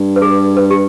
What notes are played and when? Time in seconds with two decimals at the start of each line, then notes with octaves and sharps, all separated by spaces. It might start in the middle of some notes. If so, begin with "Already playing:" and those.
Already playing: G2
0.16 B4
0.22 G#4
0.57 B4
0.71 G4